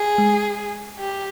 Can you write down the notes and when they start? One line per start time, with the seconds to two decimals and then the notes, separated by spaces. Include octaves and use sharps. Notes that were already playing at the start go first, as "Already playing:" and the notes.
Already playing: G#4
0.18 G#3
1.00 G4